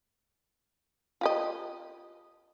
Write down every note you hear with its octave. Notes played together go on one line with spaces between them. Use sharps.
F4 G4 D#5